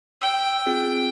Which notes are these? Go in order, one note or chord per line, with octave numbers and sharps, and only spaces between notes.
G5 E6
C4 F4 G#4